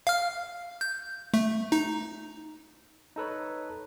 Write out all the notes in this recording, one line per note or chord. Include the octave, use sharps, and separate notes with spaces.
F5 F6
G6
A3
D#4
D#4 A4 B4 C#5